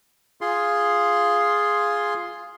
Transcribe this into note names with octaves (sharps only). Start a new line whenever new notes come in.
F4 G#4 C6